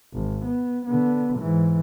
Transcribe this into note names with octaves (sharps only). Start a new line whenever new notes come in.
G#1
B3
D3 B3
G#2 E3